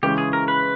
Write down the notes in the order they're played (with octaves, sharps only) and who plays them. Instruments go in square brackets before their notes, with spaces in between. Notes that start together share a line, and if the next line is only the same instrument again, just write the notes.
[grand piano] C#3 E3 G#3 C#4 [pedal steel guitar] G4
[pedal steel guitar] G#4
A#4
B4